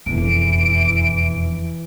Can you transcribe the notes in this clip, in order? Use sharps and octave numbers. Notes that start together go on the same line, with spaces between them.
E1 F2 E3 D7